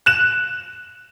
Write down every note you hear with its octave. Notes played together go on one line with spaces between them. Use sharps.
F#6 E7